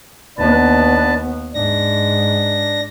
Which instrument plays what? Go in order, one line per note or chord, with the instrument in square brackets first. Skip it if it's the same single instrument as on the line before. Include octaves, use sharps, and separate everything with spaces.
[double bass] D#2 B3 [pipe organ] D4 B4 A5
[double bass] G#2 [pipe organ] D4 A#6